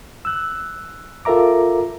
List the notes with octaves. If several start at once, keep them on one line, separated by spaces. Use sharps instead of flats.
E6 F#6
F4 A4 A#4 E5 A#5 D6